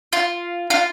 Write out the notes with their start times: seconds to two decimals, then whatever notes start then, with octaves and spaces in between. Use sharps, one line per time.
0.13 F4
0.70 F4